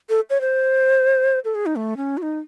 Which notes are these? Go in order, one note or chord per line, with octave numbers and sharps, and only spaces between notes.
A4
C#5
C5
A4
G#4
D#4
A3
C#4
F#4
D#4